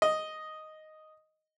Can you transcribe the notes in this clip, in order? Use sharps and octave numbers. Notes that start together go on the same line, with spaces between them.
D#5